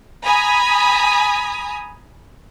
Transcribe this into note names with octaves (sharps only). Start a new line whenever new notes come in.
G#5 A#5 B5 D#6